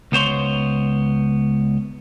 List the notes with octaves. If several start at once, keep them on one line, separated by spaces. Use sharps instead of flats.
C#2 B3 C5 C#5 C6